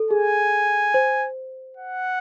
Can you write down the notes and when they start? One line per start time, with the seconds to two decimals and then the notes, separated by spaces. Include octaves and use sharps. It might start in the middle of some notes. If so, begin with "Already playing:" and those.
Already playing: A4
0.11 G#4 G#5
0.94 C5
1.77 F#5